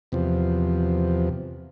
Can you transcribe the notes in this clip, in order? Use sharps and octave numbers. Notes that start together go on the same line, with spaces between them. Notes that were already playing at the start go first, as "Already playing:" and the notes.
E2 C3 F3